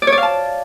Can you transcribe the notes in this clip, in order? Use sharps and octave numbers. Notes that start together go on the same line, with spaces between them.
D5
C#5
D5
F5
A5